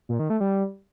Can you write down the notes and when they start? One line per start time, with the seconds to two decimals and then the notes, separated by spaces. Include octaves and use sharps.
0.09 A#2
0.19 D#3
0.30 A3
0.40 G3